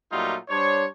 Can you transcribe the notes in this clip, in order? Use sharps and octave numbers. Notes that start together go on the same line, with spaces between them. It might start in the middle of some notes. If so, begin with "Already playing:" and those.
A#2 F#3 G3 A3 D#4 F4
G3 D4 C5 C#5